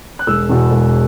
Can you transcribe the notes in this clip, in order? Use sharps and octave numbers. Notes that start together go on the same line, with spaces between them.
F#6
E1 E6
E2 B2
E1